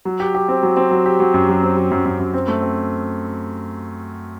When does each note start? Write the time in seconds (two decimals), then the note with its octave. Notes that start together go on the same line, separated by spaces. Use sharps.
0.05 F#3
0.20 G4
0.34 G4
0.49 C4
0.63 F#3
0.77 C4
0.91 F#3
1.06 G4
1.20 F#3
1.34 F#2
1.49 F#3
1.63 C4
1.77 F#3
1.91 F#2
2.06 F#2
2.19 F#2
2.34 C4
2.48 A3
2.63 C4